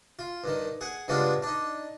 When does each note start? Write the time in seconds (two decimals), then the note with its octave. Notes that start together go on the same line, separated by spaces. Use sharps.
0.19 F4
0.44 G2 D#3
0.81 G#4 F#5
1.08 G2 C#3 G#3 B3 D4 F4
1.42 D4 D#4